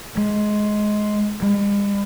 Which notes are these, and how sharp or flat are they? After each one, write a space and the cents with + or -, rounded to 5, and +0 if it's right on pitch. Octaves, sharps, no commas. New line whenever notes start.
G#3 +15
G#3 -45